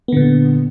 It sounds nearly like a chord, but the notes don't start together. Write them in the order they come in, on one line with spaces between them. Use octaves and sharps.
B3 D3 A#2